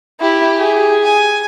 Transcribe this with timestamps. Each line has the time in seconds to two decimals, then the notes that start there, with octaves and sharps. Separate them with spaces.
0.21 E4 G4
0.58 G#4
1.04 G#5